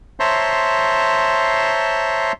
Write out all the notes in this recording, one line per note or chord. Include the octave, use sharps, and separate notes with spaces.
C5 C#5 E5 A5 A#5 C6